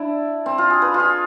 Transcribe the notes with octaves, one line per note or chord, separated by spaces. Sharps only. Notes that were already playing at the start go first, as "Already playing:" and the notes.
Already playing: D4 E4
C4
F4
G#4
B4
F4
G#4